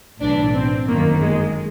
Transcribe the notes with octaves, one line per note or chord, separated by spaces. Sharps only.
B1 A2 E3 D4
C4
G1 F#2 D#3 A#3
G#3